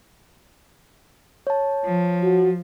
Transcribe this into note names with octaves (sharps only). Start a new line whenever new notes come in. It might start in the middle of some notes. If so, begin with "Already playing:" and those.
C#5 A5
F3
F#4